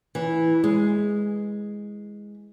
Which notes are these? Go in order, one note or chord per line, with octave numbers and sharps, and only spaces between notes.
E3
G#3